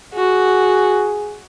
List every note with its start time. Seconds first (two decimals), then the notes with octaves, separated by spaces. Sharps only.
0.14 F#4 G#4